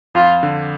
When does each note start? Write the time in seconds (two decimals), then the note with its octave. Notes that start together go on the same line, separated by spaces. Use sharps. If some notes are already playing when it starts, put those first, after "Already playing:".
0.15 F2 F4
0.43 D3